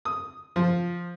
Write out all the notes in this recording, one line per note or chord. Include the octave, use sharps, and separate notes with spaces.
D#6
F3